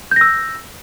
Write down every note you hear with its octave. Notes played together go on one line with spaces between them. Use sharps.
E6 G6 A#6